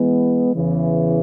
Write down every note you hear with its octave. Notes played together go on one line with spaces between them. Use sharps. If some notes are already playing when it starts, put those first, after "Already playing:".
Already playing: E3 G#3 B3
E2 C#3 E3